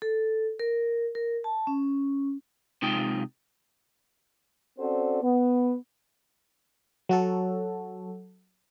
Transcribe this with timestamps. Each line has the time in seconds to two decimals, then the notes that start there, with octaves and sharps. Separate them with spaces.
0.02 A4
0.60 A#4
1.15 A#4
1.44 A5
1.67 C#4
2.82 C3 G#3 D#4 F4 G5
4.79 C4 C#4 F#4 A4 C5 D5
5.22 B3
7.09 F#3 F#4 A4